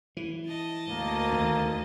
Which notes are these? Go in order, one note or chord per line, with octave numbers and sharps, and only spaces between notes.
E3
D#5 A5
D2 A#3
D#2